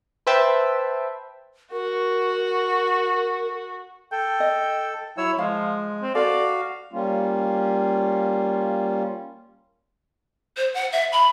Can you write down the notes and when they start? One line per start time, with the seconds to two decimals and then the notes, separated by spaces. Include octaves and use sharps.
0.27 B4 C5 E5 G5 A5
1.72 F#4 A#4
4.12 A4 G5
4.40 D#5
5.18 F#3 E4 C#5 E6
5.39 F3 G#3 F5
6.02 C4
6.15 F#4 A4 D5 F5
6.93 G3 A#3 C#4 F4
10.57 C5
10.74 F#5
10.92 E5
11.12 B5